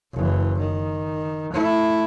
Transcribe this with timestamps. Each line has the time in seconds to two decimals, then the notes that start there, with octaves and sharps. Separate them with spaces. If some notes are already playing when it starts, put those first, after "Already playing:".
0.14 F#1 E3
0.59 D#3
1.54 A3 E4